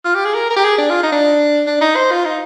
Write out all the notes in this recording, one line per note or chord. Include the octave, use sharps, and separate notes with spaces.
F4
G4
G#4
A#4
A#4
G4
G#4
D4
F4
D#4
D4
D4
D#4
C5
F4
D#4